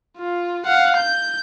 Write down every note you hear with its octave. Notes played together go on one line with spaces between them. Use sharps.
F4
F5 F#5
G6